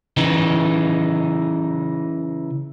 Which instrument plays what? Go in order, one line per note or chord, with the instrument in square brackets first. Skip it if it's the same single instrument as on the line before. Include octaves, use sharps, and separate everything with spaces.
[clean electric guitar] C#3 E3 D#4